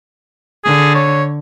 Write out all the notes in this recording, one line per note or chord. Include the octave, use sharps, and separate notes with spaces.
D3 G#4
C#5